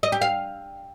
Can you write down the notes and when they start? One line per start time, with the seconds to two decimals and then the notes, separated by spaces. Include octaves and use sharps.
0.03 D#5
0.12 G4
0.22 F5